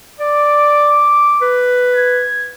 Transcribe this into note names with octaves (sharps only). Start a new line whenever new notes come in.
D5 D6
B4
G#6